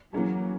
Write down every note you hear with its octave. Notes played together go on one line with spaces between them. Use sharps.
E3 F#3 A#3 C#4 G#4